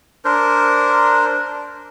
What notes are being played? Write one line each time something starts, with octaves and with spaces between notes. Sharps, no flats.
D4 A#4 C5